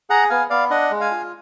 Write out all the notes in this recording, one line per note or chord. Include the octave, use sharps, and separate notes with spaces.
G#4 F#5 A#5
B3 F5 G#5
B3 D5 F5
D4 D#5 F#5
G#3
F5 G#5
F4